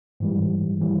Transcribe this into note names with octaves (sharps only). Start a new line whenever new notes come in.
G#2 E3 G3
E3 G3